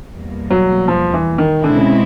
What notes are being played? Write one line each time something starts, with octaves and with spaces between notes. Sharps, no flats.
E2 B2 G3 A#3
F#3
F3
E3
D#3
B2 D3 G#3 C4 E4
C#3